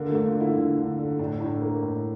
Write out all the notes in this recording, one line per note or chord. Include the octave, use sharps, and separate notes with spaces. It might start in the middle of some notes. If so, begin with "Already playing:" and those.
Already playing: D3 A#3
A3
D3
F4
D3
E4
D3
D3
D3
A2 D4
A2
A#3
A2